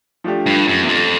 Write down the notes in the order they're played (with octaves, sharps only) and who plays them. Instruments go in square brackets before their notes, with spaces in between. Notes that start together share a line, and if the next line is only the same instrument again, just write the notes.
[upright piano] F3 A3 D4 G4
[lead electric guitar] G2
F#2
E2
F2